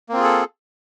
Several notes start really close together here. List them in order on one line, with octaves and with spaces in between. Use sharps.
A#3 C4 F4 G#4 A4